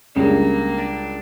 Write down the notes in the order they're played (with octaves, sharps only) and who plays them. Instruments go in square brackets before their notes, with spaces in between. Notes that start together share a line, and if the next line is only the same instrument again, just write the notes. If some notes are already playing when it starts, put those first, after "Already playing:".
[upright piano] C#2 C#3 G3 D4 [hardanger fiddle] A#3
[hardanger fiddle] D4